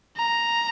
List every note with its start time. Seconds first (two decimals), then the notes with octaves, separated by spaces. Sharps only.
0.17 A#5